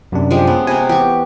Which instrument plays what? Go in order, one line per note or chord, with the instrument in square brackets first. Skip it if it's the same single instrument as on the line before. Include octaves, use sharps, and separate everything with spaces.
[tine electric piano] F#2 C3 D4
[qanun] F3 G#3 G4
B3 C#4
[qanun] C3 B3 [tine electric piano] G#5
[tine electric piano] E3 B3 [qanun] G4 C#6